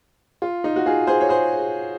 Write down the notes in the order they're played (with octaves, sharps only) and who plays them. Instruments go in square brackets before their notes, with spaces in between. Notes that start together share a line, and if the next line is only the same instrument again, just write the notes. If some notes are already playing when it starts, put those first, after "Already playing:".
[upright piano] F4
D#4
F#4
F4 G#4
G#4 C5
C#5
G#4 C5